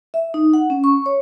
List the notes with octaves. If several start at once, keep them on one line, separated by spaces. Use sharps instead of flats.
E5
D#4
F#5
C#4
C#6
C#5